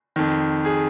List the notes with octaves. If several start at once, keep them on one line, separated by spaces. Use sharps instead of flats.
F2 D#3
G#4